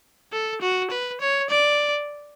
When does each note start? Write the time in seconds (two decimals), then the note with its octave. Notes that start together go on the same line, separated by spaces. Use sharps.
0.33 A4
0.62 F#4
0.91 B4
1.21 C#5
1.50 D5